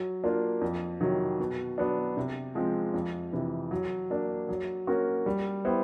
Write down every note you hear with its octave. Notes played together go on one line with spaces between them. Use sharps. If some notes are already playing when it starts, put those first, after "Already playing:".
Already playing: F#3
A#3 D4 F4
F2
C3 D#3 F#3
B2
F#3 B3 D4
C3
F3 G#3 C4
F2
C3 E3
F#3
A#3 D4
F#3
A#3 C#4 F#4 A#4
G3
B3 E4 G4 C5